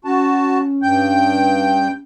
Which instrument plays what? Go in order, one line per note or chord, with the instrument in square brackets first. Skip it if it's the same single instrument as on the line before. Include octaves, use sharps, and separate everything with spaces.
[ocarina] C#4 [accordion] F#4 A5
[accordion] G2 G5 G6